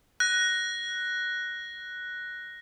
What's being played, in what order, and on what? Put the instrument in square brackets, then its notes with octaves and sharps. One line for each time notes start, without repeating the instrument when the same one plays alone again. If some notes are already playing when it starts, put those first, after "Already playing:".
[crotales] F#6 A#6